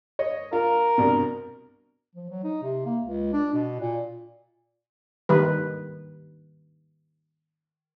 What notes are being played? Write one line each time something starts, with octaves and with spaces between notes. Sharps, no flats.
C#5 D#5
F4 A#4
C2 G2 B2
F3
F#3
D#4
C3
A#3
C#2
D4
B2
A#2
D#3 G3 B4